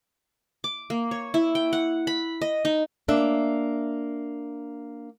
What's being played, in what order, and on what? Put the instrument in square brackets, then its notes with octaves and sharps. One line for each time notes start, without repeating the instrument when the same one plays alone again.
[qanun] D6
A#3
C#5
E4
G5
F#5
B5
D#5
D#4
[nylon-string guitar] A#3 D4 E5